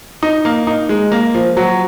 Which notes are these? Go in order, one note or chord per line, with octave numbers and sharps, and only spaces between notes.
D#4
A#3
D#4
G#3
A#3
F3
F#3